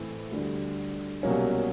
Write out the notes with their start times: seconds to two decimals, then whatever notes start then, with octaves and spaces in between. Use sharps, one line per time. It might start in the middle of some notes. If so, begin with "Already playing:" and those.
Already playing: A2 E3 A3 C4 E4
0.31 D2 D3 G3
1.23 C2 B2 F#3 A#3 C#4